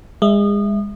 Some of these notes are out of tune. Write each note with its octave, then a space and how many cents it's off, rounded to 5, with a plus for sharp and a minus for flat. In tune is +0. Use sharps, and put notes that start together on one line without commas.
G#3 -30 E5 +0